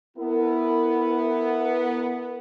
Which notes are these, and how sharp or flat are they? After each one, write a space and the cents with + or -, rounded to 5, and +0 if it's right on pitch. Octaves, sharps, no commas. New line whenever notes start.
B3 +0 E4 +0 A#4 -35